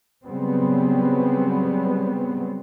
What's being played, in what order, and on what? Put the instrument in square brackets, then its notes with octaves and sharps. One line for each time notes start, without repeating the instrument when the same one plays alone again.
[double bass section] C#3 F#3 G3 B3 C4